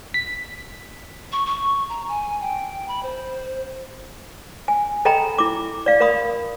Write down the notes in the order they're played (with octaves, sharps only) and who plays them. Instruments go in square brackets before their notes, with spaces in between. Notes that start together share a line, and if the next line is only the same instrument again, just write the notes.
[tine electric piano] B6
[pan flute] C#6
C#6
A#5
G#5
G5
B5
C5
[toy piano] G#5
A4 D#5 G5 A#5 B5
E4 D6
D5 F5
A#4 D5 F5 B5 D#6